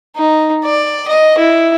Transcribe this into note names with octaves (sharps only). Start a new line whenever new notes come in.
D#4
D5
D#5
E4